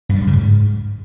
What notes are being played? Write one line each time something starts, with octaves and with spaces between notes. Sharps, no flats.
G2
G3
F#2
C#3
G#2